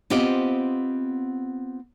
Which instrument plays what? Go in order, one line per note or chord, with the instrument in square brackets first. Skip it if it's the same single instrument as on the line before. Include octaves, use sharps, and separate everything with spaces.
[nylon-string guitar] B3 C4 F4 G4 C5 D#5